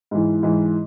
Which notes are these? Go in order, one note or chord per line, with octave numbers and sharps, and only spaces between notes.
G#2 E3
G#2 E3